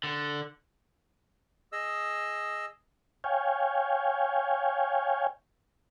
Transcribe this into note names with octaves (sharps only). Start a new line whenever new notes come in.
D3
G#4 D#5 E6
C#5 F5 G5 G#5